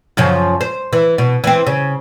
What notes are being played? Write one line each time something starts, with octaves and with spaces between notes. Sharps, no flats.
F#2 C#3 F3
C5
E3
B2
E3 C4
C#3